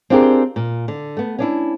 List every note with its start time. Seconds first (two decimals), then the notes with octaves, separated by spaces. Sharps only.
0.10 C4 D4 F4 G4 G#4 A#4
0.56 A#2
0.88 D3
1.17 A3 B3
1.39 C#4 D4 E4